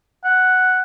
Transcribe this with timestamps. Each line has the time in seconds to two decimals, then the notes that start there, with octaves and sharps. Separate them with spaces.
0.24 F#5